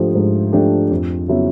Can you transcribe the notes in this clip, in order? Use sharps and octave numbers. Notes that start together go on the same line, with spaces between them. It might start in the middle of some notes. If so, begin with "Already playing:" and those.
Already playing: G#2 F3 A3 D4 G4
G#2
F3 A3 D4 G4
F2
C#3 F#3 B3 E4